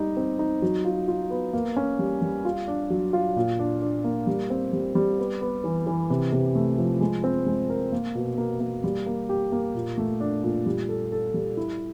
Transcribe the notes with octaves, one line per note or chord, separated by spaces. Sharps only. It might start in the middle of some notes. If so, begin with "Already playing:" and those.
Already playing: G3 D#4
C4
D#4
F#3
F4
F4
B3
A#3
C#4
G3
G3
F4
D4
F#3
F4
A#2
D4
D4
A#3
G3
C4
G3
G3
B3
B3
E3
E3
C3
C3
A3
F3
G#3
C4
G#3
A#4
A#3
B2
A#3
A#3
G3
A#3
G4
A#3
A#2
A3
D4
A#2
G3
A4
A4
G3
E4